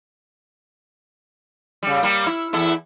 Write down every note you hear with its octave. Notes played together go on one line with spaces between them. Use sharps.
C#3 G3
G3 A#3
E4
E2 E4 A4